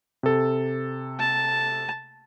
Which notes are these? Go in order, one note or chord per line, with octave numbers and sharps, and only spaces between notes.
C3 A4
A5